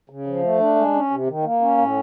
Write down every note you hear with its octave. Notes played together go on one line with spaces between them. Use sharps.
C#3
F3
A3
D4
G#3
C#4
C3
D#3
A#3
C#4
A2